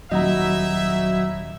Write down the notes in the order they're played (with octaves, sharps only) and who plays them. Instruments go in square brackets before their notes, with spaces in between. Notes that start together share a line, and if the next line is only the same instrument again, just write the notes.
[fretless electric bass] D#1 [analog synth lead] F#3 [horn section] D#4 E4 E5 [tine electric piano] D#5 F#5 A#5